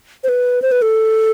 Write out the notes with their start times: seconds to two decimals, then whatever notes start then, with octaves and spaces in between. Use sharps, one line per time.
0.24 C5
0.29 B4
0.62 C5
0.72 B4
0.82 A4